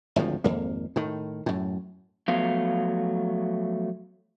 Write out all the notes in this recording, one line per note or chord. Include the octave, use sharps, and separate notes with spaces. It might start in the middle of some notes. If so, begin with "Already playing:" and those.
G#1 D2 A2 F3
G#1 F2 A#3
A2 D#3
F#2 A2
F3 F#3 A3 B3 F5